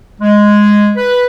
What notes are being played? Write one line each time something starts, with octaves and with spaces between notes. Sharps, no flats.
G#3
B4